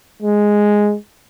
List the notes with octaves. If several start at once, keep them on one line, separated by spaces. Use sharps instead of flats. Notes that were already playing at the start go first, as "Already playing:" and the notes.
G#3